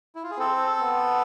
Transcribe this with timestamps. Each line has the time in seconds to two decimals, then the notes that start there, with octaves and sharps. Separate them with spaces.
0.15 E4
0.23 F4
0.31 G#4
0.38 C4 A4
0.81 B3